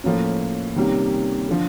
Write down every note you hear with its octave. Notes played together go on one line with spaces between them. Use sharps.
A2 F3 A#3 C#4
C3 D#3 G3 A#3 C#4
D3 F3